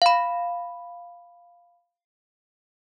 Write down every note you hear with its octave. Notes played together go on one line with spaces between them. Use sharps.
F5 B5